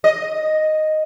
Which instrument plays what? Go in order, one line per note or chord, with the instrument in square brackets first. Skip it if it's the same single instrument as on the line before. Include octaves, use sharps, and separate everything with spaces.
[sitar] D#5